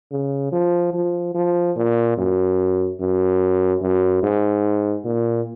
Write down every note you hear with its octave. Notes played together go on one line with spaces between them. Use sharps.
C#3
F3
F3
F3
A#2
F#2
F#2
F#2
G#2
A#2